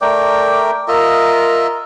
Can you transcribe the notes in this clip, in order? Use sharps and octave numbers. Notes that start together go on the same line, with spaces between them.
A3 A#4 D5 G5
F4 A#4 D#5 E5